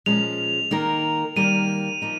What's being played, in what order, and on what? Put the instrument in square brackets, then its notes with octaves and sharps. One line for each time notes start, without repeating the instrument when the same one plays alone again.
[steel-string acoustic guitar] A#2 F3 G#3 C#4 [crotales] F7
[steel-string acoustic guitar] D#3 A#3 D#4 A#4
[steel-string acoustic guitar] D#3 G3 A#3 [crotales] D#7
[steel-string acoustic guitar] F3 A#3 D#4